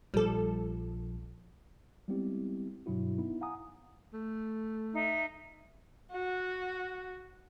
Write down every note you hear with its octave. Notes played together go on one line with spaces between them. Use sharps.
A#1 F3 G3 A4
G3 G#3 B3 C4 E4 G4
G2 B2 F#3 E4 F#4
B3 D#4 E4
F5 F#5 G#5 A#5 D#6
A3
D#4 E5
F#4